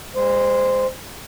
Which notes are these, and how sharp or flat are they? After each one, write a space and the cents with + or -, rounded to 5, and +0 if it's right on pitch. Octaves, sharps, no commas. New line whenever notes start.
G#3 -45 C5 -15